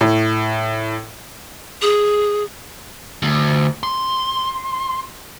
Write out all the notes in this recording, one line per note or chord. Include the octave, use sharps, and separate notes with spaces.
A2
G#4
D2
C6